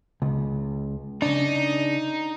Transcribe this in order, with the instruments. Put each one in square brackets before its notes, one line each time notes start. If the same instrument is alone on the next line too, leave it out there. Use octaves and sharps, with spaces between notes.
[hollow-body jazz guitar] C#2
[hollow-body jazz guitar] C#3 D4 [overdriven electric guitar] D#4